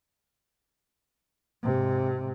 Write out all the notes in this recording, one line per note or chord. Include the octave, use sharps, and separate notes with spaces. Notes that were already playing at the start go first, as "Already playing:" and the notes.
G#2 C3